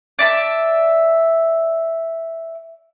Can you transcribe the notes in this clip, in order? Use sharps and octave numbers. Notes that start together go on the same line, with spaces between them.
D5 E5 A5